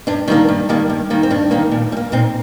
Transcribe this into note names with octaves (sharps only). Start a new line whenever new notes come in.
G2 D4
D#3 G3 A#3 D4
G2
D#3 G3 A#3
G2
D#3 G3 A#3
C4
G2 D4
D#3 G3 A#3
A#2
G3
A#3
A#2 C4 D#4